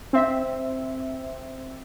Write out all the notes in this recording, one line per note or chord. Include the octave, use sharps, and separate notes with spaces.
C4 E5